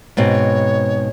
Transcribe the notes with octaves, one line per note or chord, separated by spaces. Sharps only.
G#2 B2 C4 C#5